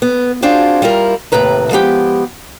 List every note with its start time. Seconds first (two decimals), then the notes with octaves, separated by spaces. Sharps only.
0.02 B3
0.42 C4 D4 F4 F#4 G#4 C5
0.82 G3 E4 F4 A#4
1.32 D#2 A2 C3 B4 A#5
1.71 F3 G#3 B3 G4